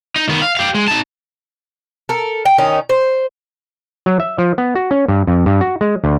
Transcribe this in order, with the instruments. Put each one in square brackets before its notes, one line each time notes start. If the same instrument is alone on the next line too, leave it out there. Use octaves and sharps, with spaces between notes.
[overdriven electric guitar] D#4
D#3 B3
F5
G4 F5
G#3
D#4 A5
[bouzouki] A4 A#4
G5
D#3 C#4 D#4
C5
[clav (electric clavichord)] F#3
E5
F3
B3
F#4
C#4
G2
F2
G2
F#4
G#3
D2